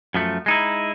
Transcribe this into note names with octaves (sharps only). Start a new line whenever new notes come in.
F#2 F3 A3
G#3 D#4 E4